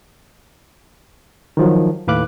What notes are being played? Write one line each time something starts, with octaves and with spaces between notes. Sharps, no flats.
D#3 F3 F#3
D#2 A2 B4 F5 D6 F#6